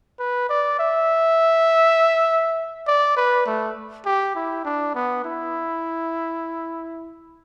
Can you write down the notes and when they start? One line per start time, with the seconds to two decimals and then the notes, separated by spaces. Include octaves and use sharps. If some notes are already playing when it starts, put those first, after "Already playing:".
0.19 B4
0.49 D5
0.79 E5
2.87 D5
3.16 B4
3.46 A3
4.06 G4
4.35 E4
4.65 D4
4.95 B3
5.25 E4